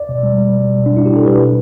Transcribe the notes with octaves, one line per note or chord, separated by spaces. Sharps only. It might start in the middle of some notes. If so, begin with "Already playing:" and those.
Already playing: D5
B2
G3
G3
B2
B2
G3 D4
G3 E4
G4
B2
A4
B2 B4
G3